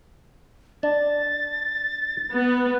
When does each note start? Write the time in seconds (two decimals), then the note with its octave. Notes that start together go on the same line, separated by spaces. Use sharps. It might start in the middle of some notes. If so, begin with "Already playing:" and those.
0.83 D4 A6
2.33 B3